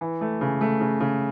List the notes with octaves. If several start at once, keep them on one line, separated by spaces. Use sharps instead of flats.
E3
A3
C#3
A3
C#3
C#3